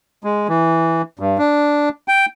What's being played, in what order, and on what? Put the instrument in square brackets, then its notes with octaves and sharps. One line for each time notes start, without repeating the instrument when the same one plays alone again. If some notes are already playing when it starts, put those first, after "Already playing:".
[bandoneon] G#3
E3
G2
D4
G5